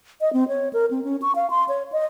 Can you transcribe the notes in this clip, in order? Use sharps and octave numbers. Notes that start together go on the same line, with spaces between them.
D#5
C4
C#5
A#4
C4
C#4
C#6
F5
C6
C#5
D#5